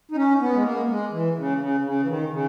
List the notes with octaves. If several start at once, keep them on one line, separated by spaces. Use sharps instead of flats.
D#4
C#4
B3
G#3
A#3
G#3
E3
C#3
C#3
C#3
E3
D#3
C#3